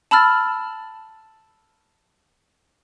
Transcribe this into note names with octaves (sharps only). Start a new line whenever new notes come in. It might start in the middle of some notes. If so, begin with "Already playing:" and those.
A5 B5 E6 F6 A6